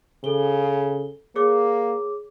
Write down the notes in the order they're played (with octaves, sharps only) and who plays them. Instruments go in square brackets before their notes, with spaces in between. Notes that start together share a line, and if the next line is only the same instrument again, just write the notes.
[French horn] C#3 [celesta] A4 G7
[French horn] A#3 [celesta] G#4 C#5 D6